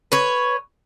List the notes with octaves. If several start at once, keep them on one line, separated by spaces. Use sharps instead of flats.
B4 C#5